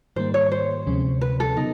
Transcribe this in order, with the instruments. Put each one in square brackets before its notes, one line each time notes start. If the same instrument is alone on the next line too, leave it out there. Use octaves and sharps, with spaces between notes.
[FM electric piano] G#2 D#3 G3 A#3 [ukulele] C5
[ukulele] C#5
C5
[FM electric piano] D2 C3 F3 G#3 C#4
[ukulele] B4
A4
[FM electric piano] C#3 F#3 B3 [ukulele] D#4